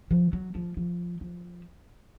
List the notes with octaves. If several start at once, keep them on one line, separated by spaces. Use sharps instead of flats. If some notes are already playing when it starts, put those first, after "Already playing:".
F3
F#3
F3
F3
F3